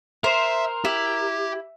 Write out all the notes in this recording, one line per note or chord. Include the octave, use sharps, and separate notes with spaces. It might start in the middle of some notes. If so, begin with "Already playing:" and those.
A#4 C5 E5
E4 G4